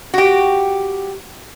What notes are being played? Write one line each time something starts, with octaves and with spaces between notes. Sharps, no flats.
F#4 G4